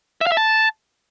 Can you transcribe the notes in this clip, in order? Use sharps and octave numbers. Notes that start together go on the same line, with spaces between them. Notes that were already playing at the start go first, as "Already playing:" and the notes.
E5
F5
E5
A5